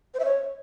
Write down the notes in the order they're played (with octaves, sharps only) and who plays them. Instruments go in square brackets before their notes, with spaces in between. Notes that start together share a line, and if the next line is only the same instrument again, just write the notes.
[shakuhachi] C5
E5
C#5